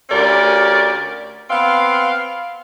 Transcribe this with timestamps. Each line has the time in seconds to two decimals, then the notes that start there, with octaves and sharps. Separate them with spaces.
0.10 D2 C#4 G4 A#4 D5
1.50 B3 C4 F5